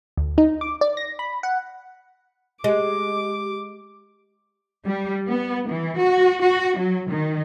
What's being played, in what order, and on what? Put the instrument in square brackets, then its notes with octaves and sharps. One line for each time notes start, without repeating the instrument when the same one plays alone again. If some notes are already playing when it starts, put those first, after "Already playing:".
[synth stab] D2
D#4
D6
D5
A#6
B5
F#5
[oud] G#3 [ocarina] G4 [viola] D6
[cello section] G3
B3
E3
F#4
F#4
F#3
D#3